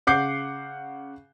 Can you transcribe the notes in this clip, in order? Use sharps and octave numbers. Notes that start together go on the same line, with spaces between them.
C#3 F#5 D6 G6 C7